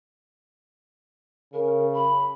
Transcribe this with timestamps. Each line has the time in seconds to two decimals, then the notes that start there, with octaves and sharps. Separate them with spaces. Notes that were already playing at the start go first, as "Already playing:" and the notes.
1.53 C#3 A#4
1.94 B5